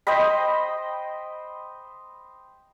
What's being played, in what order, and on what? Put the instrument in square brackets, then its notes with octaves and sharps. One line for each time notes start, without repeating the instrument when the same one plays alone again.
[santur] C5 D#5 G5 B5